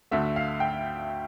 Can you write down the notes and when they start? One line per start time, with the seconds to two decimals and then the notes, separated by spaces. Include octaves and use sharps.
0.11 D2 D3 A3 E5
0.36 F5
0.60 G5